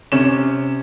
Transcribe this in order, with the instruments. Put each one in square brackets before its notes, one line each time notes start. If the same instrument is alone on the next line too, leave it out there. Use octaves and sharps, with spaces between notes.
[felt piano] C3 C#4 E7